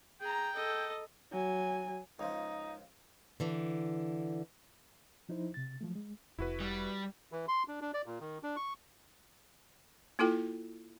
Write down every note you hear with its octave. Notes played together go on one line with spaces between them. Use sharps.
G#4 G5 A#5
A4 D#5
F#3 G#5
C#2 F3 D#4
D3 E3
F3 D#4 E4 C5
C3 A6
F3 F#3 A3
G#3
F1 E4 F#4 B4
G3
E3
C6
D4
D4
D5
A#2
D#3
D4
C#6
A#3 E4 F4 A4 G5